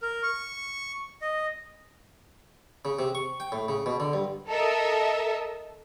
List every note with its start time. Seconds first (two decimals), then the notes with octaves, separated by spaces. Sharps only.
0.02 A#4
0.23 C#6
1.22 D#5
2.85 C#3
2.99 C3
3.15 C#6
3.40 G5
3.52 A2
3.68 C#3
3.86 B2
4.00 D3
4.13 G2
4.49 A4 A#4 D#5 E5